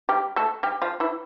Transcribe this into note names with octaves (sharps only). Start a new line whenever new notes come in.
G3 G4
A3 A4
G3 G4
F3 F4
E3 E4